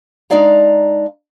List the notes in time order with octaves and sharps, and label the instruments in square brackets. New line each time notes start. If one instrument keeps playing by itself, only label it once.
[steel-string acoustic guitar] G#3 D4 D#4 D5 F5 A#5